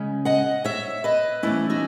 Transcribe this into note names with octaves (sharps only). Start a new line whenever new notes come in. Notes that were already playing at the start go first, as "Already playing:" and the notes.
Already playing: C#3 G#3 C#4
D#5 F#5
C#5 E5
B4 D#5
E2 B2 A3 C#4 E4
D#4 F#4